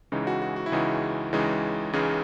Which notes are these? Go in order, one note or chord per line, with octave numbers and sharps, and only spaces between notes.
C#2 C#3 E3 G#3 D#4
F#4
F#4
F#4
E4
C#2 C#3 E3 G#3 D#4 F#4
C#2 C#3 E3 G#3 D#4
C#2 C#3 E3 G#3 D#4 G#4